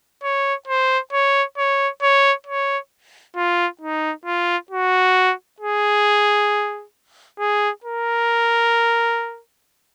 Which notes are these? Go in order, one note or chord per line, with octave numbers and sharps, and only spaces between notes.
C#5
C5
C#5
C#5
C#5
C#5
F4
D#4
F4
F#4
G#4
G#4
A#4